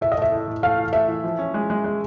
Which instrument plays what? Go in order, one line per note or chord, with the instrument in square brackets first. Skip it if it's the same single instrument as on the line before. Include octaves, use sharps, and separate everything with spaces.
[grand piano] A2 [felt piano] E5
[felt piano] D#5
[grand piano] A3 [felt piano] E5
[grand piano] A2
A2
[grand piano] A3 [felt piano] F5
[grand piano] E3
[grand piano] A3 [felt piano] E5
[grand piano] E3
F3
C#4
G#3
G#3
G#3